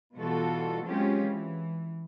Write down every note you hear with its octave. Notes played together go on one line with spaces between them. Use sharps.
B2 E3 G3 F4 F#4 A4
F#3 G#3 C4 C#4 F4 G4
E3